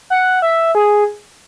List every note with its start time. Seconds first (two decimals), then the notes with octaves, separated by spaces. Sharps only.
0.10 F#5
0.42 E5
0.75 G#4